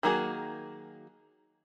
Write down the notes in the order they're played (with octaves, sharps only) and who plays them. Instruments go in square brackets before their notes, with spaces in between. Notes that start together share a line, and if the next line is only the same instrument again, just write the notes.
[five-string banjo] D#3 F#3 A#3 F#4 G#4